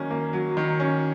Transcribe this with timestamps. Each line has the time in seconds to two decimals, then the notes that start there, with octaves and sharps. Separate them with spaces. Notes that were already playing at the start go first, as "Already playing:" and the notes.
Already playing: D#3 F#3 A#3 C#4
0.11 A#3
0.33 F#3
0.57 D#3
0.80 C#4